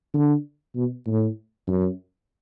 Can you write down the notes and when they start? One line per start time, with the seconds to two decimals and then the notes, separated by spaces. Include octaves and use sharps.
0.14 D3
0.75 B2
1.06 A2
1.68 F#2